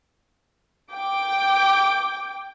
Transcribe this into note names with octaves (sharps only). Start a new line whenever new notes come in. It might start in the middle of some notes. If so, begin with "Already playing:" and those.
G5 D6